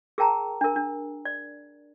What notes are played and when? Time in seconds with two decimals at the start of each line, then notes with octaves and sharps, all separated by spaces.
0.18 G#4 A#4 G5 A5 A#5
0.61 D4 A#4
0.76 D4
1.25 D5